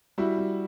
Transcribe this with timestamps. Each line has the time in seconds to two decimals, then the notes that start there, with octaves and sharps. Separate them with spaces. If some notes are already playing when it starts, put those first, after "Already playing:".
0.18 G3 E4 F#4
0.38 G3